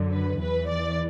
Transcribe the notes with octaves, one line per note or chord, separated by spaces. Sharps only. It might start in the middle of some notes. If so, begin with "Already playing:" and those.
Already playing: F#2 D3 F#3
B4
E2 E3 B4
D5